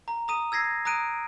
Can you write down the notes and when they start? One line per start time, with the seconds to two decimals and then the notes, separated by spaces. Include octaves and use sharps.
0.08 A#5
0.28 A#5 D#6 D#7
0.52 E6 G#6 A#6 C7
0.85 A#5 D#6 F#6 D7 D#7